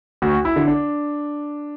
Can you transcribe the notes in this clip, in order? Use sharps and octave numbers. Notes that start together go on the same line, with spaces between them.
D2 F#4
E4
D3
D4